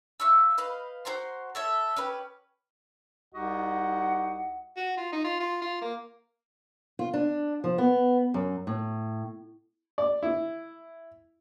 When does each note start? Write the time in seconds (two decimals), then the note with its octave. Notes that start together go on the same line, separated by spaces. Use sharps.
0.20 E5 F5 C#6 E6
0.58 B4 D#5 F5 G6
1.05 F#4 C5 A#5 C6
1.55 A4 C#5 E5
1.96 C#4 G4 B4
3.33 C2 D#4 F#4 G4 D#5 F#5
4.77 F#4
4.97 F4
5.12 D#4
5.24 F4
5.40 F4
5.62 F4
5.82 A#3
6.99 F4
7.14 D4
7.64 F3
7.78 B3
8.34 F#2
8.67 A2
9.98 D5
10.23 E4